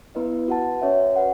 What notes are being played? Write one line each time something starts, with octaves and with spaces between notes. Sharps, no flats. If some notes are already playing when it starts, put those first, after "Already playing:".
B3 E4 B4 D#5
F#4 B4 F#5 A5
C#4 F#4 C#5 E5
B4 F#5